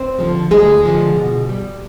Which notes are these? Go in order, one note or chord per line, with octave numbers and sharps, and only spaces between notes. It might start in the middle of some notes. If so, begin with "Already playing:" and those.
Already playing: C4 C5
D3 F3 G#3
D2 G#3 G#4
D3 F3 G#3
B2
G3